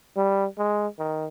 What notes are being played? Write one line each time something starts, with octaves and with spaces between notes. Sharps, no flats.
G3
G#3
D#3